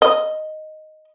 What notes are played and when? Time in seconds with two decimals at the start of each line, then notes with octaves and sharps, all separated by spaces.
0.02 D#5